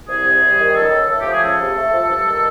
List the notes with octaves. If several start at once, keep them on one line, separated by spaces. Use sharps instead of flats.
C2 G#4
C3
G3
D#3
C#2 A4
C#3
A3 A4
G4
F3
G#4
C#2 A4
C3
A3
F3
G2
D#3